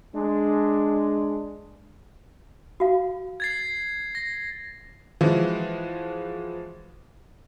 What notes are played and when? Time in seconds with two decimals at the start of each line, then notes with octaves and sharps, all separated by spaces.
0.14 G#3 D4
2.80 F#4 F5
3.40 G#6 A6 C7
4.15 A#6
5.21 E3 F3 G#3 F#4